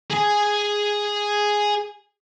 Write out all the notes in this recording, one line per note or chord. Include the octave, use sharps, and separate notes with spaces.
G#4 G#5